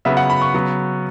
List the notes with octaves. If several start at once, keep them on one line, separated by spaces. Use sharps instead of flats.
C#3 F#3 B3 E5
F#5
B5
C#6
C#3 F#3 B3